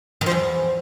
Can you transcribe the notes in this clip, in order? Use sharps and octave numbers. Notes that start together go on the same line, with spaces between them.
D#3
F3
E2